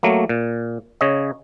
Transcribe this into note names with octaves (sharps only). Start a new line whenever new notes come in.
F#3 A3 A#3
A#2
C#3 C#5 D#5